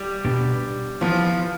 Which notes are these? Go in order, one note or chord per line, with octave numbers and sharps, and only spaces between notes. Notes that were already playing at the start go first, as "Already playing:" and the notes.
Already playing: G3
B2 B3 D4 G4
E3 F3 B3